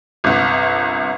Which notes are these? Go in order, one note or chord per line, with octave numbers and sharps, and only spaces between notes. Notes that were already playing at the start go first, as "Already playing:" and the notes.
G1 C2